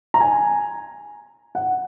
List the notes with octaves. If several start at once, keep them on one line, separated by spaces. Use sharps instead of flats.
A#5
G#5
F#5